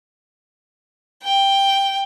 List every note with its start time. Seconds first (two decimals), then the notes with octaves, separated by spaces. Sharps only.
1.22 G5